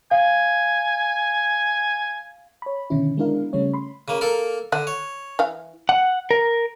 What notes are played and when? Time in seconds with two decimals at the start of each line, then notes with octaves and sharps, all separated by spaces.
0.11 F5 G#5
2.62 C#5 B5
2.90 B2 D3 D#3 C#4 E4
3.17 G#3 B3 D4 E4 A#4 F5
3.53 C#3 G3 A3 C#4 C#5
3.73 B5 C6
4.08 C#3 A#3
4.21 A#3 A4 A#4
4.72 D3 F#5
4.87 C#5
5.39 E3 F5
5.89 F#5
6.31 A#4